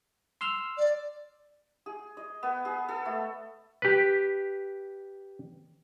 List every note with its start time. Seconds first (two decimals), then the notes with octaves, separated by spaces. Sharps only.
0.41 C6 E6 F6
0.77 D5
1.86 G#4
2.17 D#5
2.43 B3
2.65 G#4
2.88 A4
3.05 A3
3.82 G4 B4